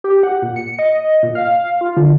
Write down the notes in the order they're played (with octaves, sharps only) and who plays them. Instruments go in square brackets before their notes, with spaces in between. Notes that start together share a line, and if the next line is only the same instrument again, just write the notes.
[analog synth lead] G4
F#5
A#2
C#7
D#5
A#2
F5
F4
D3